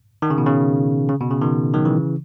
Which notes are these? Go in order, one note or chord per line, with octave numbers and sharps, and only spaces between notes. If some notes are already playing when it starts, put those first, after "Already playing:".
D#3
C#3
B2
C#3
C#3
B2
C#3
B2 D#3
D#3 F#3
C#3 E3